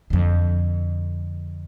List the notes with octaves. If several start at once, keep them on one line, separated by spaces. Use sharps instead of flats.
F2 D3